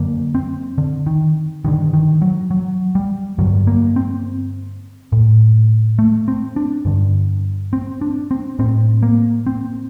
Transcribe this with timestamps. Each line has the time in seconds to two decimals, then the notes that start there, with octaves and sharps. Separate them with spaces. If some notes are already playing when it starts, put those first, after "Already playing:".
Already playing: F#2 D3 A#3
0.35 C4
0.78 D3
1.06 D#3
1.65 G2 D3 D#3
1.93 D#3
2.22 F#3
2.51 F#3
2.95 G3
3.39 G2 D3 F#3
3.67 A#3
3.96 C4
5.12 A2
5.99 A3
6.28 C4
6.56 D4
6.85 G2 D3
7.73 C4
8.01 D4
8.31 C4
8.59 A2 C4
9.03 A#3
9.47 C4